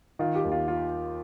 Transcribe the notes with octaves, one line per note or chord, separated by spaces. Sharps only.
D#3 F4
G4
D#2
F4
F4